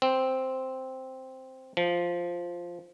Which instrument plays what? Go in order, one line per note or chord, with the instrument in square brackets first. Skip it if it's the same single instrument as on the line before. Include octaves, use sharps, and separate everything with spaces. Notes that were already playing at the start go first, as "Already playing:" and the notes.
[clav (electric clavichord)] C4
F3